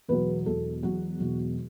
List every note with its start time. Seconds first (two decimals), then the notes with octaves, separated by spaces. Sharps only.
0.08 E1 E2 B2 F#3 B4
0.46 E1 E2 B2 F#3 A4
0.83 E1 E2 B2 F#3 F#4
1.19 E1 E2 B2 F#3